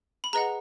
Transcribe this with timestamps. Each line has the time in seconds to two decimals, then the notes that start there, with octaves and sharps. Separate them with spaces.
0.24 B5
0.33 G#4 B4 D#5 F#5 A#5